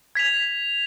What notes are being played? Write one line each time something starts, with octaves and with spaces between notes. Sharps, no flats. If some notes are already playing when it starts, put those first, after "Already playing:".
G#6 B6 F7